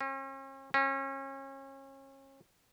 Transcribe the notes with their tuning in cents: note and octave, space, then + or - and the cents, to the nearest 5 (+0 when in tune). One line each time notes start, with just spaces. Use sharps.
C#4 -45
C#4 -35